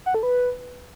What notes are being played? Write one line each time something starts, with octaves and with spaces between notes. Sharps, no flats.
F#5
A4
B4